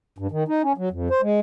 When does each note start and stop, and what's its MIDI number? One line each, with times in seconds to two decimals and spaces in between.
0.18 0.27 43
0.32 0.44 51
0.48 0.62 63
0.63 0.73 61
0.78 0.89 54
0.91 1.08 41
1.10 1.21 72
1.22 1.40 56